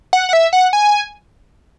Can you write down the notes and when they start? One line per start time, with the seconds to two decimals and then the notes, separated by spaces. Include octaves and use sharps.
0.13 F#5
0.29 F#5
0.33 E5
0.53 F#5
0.73 G#5